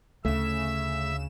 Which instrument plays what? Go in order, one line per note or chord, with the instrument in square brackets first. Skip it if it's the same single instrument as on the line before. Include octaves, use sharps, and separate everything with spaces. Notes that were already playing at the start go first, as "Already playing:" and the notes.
[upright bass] D2 [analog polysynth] C#3 E7 [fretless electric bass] A3 [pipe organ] E5